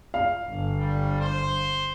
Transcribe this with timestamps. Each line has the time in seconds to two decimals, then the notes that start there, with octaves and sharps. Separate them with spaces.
0.14 F5
0.50 G1
0.79 G3
1.21 C5